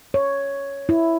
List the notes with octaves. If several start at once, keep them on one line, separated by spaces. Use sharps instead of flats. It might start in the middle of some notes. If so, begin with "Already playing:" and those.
C#5
E4